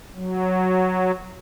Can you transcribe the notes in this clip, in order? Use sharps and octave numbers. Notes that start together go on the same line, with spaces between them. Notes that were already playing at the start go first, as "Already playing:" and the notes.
F#3